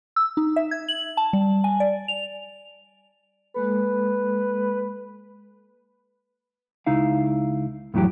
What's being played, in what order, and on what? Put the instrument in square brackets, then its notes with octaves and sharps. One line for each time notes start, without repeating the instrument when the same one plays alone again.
[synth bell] E6
D#4
E5
G#6
F#7
A5
G3
G#5
D5
F7
[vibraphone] G#3 A#3 A4 [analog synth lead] B4
[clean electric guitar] C#2 D#4 E4 F5
F2 A2 E3 F#3 G4